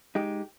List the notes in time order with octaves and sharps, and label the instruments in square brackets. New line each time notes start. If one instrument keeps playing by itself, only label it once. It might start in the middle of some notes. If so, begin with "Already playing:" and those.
[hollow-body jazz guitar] G#3 D#4 G4